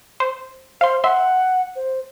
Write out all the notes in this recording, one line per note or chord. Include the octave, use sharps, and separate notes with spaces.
C5
C5 F5 C6
E5 F#5 C6
C5